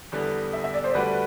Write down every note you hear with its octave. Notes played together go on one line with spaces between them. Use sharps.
E2 D3 G3 B3
E5
E5
D5
C5
D2 D3 G3 D4 F#4 B4